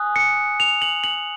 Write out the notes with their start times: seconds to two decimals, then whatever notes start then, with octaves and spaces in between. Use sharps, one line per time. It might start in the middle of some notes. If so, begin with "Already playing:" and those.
Already playing: G#5 D#6 F#6
0.16 C#7
0.60 F7
0.82 F#7
1.04 F#7